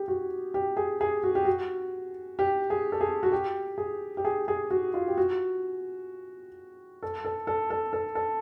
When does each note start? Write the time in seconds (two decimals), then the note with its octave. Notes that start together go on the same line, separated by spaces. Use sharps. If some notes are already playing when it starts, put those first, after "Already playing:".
Already playing: G4 G#4
0.08 F#4
0.54 G4
0.77 G#4
1.01 G#4
1.24 F#4
1.35 G4
1.45 F#4
2.39 G4
2.70 G#4
2.92 A4
3.01 G#4
3.23 F#4
3.32 G4
3.78 G#4
4.17 G4
4.25 G#4
4.48 G#4
4.70 F#4
4.94 F4
5.08 G4
5.17 F#4
7.03 A4
7.25 A4
7.47 A4
7.70 A4
7.93 A4
8.15 A4